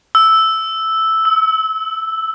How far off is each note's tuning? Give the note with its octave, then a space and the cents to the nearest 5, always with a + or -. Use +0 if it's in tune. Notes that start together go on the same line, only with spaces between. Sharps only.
E6 -5
E6 -30